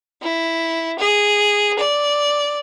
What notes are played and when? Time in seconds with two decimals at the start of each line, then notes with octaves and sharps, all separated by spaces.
0.22 E4
0.99 G#4
1.78 D5